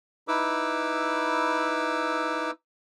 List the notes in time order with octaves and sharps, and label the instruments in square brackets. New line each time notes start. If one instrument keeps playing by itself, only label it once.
[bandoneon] D#4 E4 B4 D6 E6